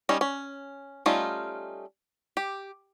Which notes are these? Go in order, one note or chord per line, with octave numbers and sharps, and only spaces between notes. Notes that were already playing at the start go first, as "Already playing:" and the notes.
G3 C#4 D#4
C#4
G3 A3 C#4 D#4 F4
G4